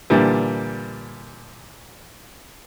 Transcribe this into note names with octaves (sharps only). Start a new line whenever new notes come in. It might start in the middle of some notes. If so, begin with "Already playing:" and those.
A#2 D3 E3 G3